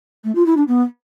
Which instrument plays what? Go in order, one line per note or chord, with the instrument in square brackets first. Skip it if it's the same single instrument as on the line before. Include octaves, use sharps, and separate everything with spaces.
[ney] A3
F4
E4
D4
B3